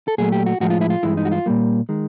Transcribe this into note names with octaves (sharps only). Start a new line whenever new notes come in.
A4
A#2 F#3 A3 G#4
G4
F#4
A2 F3 G#3 F#4
F4
E4
F4
G2 E3 G#3 E4
D#4
F#4
F4
A#2 G3 A#3
D#3 G#3